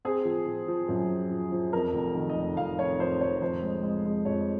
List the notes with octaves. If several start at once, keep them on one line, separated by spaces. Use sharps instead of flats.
C4 G#4
F3
F3
F3
F#2
F3
F3
F3
F2 A#4
F1
D#3
D#5
F1
F2 F5
F2 C#5
F2 C5
F1 C#5
F2 C5
G#3
G#3
G#3
F2 C#5